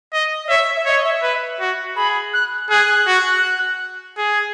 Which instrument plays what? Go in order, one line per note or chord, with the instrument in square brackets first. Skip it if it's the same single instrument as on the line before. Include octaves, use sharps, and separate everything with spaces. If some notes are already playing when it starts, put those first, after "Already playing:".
[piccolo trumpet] D#5
[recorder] D#5
[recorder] C#5 [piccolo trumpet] E5
[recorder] E5
[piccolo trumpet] C#5 [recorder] D#5
[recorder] D#5
E5
[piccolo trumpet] B4
F#4
[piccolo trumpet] G#4 [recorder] B5
[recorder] F#6
[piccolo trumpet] G#4 [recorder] F#6
[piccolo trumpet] F#4
G#4